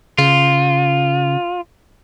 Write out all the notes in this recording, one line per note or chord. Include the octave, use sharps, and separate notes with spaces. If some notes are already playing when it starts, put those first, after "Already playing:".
C#3 F4